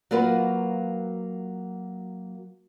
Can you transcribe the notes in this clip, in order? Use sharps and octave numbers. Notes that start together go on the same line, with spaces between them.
F#3 A#3 F4 F#4 A#4 B4